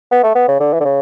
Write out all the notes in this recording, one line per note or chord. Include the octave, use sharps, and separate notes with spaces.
B3
A3
B3
C#3
D3
E3
D3
C#3